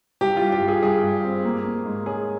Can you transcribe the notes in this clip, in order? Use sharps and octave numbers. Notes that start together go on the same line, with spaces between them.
G2 G4
F4
G2
G4
G2
G#4
G2 G#4
G2
C4
A#3
A#3
G#2
C#4 G#4